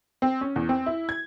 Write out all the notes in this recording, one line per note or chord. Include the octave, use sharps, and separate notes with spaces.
C4
C#4
E2
C4
E4
G#6